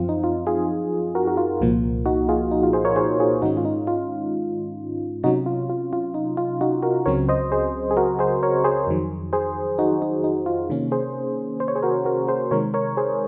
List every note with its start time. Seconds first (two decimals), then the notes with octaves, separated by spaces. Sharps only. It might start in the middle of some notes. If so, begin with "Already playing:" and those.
Already playing: F#2 F3 C4 F4
0.09 D#4
0.24 F4
0.47 F4 G#4
1.15 F#4 A#4
1.28 F#4
1.37 F4
1.60 C2 A#2 F3 A#3
2.06 D#4 F#4
2.29 F4 G#4
2.51 D#4
2.63 F4
2.73 G#4 C5
2.85 A#4 C#5
2.96 G#4 C5
3.19 F4 G#4
3.42 G#2 D#3 G#3 C#4 D#4 F#4
3.57 F4
3.65 D#4
3.87 F4
5.23 C3 F#3 C#4 D#4 F#4
5.46 F4
5.70 F4
5.93 F4
6.14 D#4
6.37 F4
6.61 D#4 F#4
6.83 F#4 A#4
7.06 C#2 C#3 F#3 C4 A#4 C#5
7.29 C5 D#5
7.52 G#4 C5
7.91 G#4
7.97 F#4 A#4
8.19 G#4 C5
8.43 A#4 C#5
8.64 G#4 C5
8.87 F2 D#3 F#3
9.33 G#4 C5
9.79 D#4 F#4
10.02 D#4
10.24 D#4
10.46 F4
10.70 C3 D#3 A#3 C#4
10.92 G#4 C5
11.60 C5
11.68 C#5
11.76 G#4 C5
11.83 F#4 A#4
12.05 F#4 A#4
12.28 G#4 C5
12.51 C3 D#3 G#3 A#4 C#5
12.74 A#4 C#5
12.97 G#4 C5